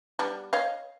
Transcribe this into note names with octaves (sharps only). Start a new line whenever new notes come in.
G3 B3 D4
C#5 D#5 F5